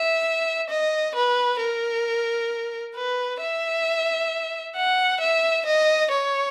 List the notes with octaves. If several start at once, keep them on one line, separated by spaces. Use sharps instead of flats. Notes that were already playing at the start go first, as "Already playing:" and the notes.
Already playing: E5
D#5
B4
A#4
B4
E5
F#5
E5
D#5
C#5